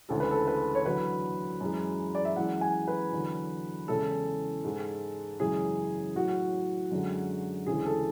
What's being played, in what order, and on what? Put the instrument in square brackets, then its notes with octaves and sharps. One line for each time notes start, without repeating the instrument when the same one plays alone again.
[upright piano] D2 C#3 E3 G#3 A4
B4
A4
B4
C#5
E2 D3 F#3 B4
F#2 E3 G#3
D5
E5
F#2 E3 G#3 F#5
G#5
B4
E2 D3 F#3
E2 C#3 E3 G#3 A4
G#2 G#3
F#2 C#3 E3 G#3 G#4
A2 F#3 F#4
F#2 D3 G#3
D2 C#3 E3 G#3 G#4
A4